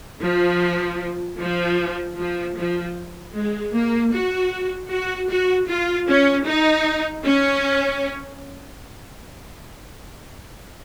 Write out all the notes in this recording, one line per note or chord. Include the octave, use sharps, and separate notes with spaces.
F3
F3
F3
F3
G#3
A#3
F#4
F#4
F#4
F4
C#4
D#4
C#4